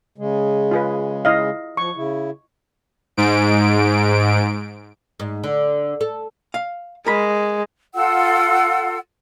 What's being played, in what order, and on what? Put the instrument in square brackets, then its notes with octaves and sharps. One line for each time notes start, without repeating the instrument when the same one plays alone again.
[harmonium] C#3 G#3
[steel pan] F4 G#4 B4
E4 D#5 F5
[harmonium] F3 [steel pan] C#6
[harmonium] C#3 E4
[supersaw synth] G#2 D7
[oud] G#2
D3
A4
[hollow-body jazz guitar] F5
[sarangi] G#3 [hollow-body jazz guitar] A#4 B5
[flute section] F4 A4 F#5 E6